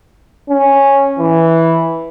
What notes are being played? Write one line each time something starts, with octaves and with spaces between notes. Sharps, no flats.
C#4
E3